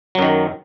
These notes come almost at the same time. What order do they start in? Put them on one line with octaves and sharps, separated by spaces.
F#3 F#2 D#3